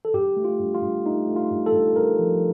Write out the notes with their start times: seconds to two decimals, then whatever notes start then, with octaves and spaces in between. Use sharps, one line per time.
0.05 A4
0.14 G2 G4
0.37 A3
0.44 F4
0.59 G2
0.74 F4
0.82 G2
1.05 A3 D#4
1.28 A3
1.36 F4
1.51 G2
1.66 A4
1.73 G2
1.96 G2 A#4
2.19 F3